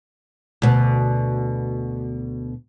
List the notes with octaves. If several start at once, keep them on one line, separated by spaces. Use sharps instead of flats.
D2 B2